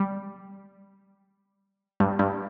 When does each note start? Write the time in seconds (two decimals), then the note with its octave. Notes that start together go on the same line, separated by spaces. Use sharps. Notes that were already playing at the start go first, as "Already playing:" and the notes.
Already playing: G3
2.00 G2
2.19 G2